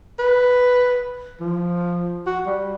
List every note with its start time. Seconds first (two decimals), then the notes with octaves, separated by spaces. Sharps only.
0.19 B4
1.40 F3
2.27 F#4
2.46 G3